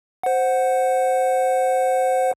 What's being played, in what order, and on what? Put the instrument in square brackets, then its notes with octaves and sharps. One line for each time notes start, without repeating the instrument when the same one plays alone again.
[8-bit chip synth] C5 F#5